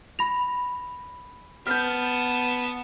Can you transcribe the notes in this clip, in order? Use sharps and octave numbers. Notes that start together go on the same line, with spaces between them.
B5 A#6 F7
B3 A5 F6 G6